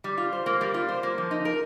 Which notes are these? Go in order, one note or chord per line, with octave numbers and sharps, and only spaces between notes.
G3
F4
C5
A#3
G3
F4
C5
A#3
F3
D#4
A#4